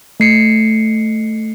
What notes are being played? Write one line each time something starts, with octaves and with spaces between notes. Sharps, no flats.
A3 C7 C#7